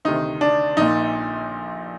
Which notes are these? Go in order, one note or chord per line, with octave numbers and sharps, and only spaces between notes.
D2 C3 D#3 D#4
D4
A#1 A#2 D#4